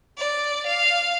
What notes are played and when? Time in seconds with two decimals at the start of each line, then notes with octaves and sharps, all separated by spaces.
0.18 D5
0.67 F5